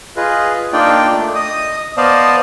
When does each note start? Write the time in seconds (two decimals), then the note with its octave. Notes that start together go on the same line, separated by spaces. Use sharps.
0.17 F4 G#4 B4 D#5
0.73 A#3 D4 D#4 F4 D5 G5
1.12 A3
1.35 D#5 D#6
1.97 B3 C5 D5 D#5 F5 A5